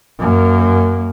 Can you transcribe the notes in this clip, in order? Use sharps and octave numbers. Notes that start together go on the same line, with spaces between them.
F#2 A#3